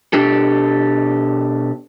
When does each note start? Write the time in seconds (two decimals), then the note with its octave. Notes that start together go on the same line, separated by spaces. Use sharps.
0.13 B2 D4 G4 A4